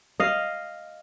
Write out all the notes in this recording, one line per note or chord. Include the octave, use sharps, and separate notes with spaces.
D#5 F5